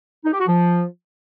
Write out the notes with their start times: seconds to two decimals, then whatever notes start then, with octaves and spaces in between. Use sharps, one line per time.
0.24 D#4
0.32 G4
0.40 F#4
0.48 F3